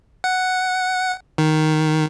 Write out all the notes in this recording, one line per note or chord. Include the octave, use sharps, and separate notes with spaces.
F#5
D#3